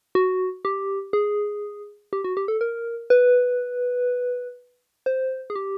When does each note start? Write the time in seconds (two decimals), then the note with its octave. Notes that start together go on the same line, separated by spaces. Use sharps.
0.15 F#4
0.65 G4
1.13 G#4
2.13 G4
2.24 F#4
2.37 G4
2.48 A4
2.61 A#4
3.10 B4
5.06 C5
5.50 G#4
5.56 G4